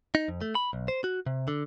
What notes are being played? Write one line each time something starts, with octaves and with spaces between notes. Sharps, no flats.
D#4
F2
A3
B5
B1
C5
F#4
C3
D3